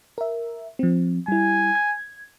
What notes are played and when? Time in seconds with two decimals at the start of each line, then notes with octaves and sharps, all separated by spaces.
0.18 A#4 E5
0.79 F3 C4
1.28 G3 E4 G#5
1.75 G#6